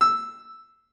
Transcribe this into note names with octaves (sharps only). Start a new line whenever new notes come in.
E6